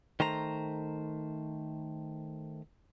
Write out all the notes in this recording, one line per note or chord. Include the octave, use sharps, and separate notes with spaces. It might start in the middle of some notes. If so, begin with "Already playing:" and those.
D#3 A3 C5 A#5